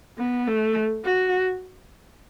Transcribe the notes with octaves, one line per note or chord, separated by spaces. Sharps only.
B3
A3
F#4